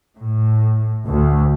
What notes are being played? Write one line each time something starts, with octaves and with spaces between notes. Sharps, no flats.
A2
D2